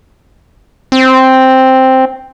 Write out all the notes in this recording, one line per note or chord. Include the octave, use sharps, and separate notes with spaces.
C4